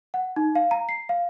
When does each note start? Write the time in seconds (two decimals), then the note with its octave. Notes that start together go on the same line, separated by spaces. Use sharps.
0.14 F#5
0.36 D#4
0.55 F5
0.71 A#5
0.89 C7
1.09 F5